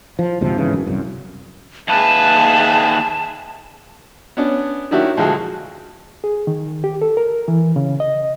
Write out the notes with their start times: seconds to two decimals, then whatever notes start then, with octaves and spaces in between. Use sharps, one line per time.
0.19 F3
0.41 D2 G#2 C3 F3
0.56 G1 G#2 C#3 E3
0.73 F#2
0.86 C2 F#2
1.88 D#2 G#4 B4 E5 A5
4.37 B3 C#4 D4
4.91 D#3 F#3 D4 E4 F#4 G4
5.17 D2 F3 G#3 F#4
6.24 G#4
6.47 D#3
6.84 G4
7.02 A4
7.17 A#4
7.48 E3
7.76 C#3
8.00 D#5